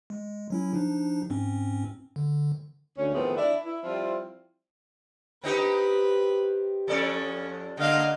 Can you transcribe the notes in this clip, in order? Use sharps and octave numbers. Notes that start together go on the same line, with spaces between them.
G#3
F#3 C#4 E4
F3 D4 D#4
G#2 C4 C#4
D3
D2 C#4
F2 A2 D#3 B3 C4 G#4
D4 E4 D5
E4
F3 G3 C4 E4 F4
C4 D#4 G4 B4
F2 C#4 A4 D5
D3 A#3 D#5 F5